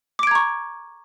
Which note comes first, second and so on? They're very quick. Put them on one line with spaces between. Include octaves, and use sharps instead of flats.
D6 D7 G#6 A#5 C#6